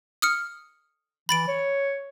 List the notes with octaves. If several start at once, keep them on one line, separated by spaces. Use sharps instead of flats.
D#6 F6 C#7
E3 B5 A6 D7
C#5